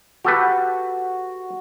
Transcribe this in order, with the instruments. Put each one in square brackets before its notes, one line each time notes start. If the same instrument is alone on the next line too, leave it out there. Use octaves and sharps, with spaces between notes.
[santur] F#4 [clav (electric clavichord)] G4 A4 B4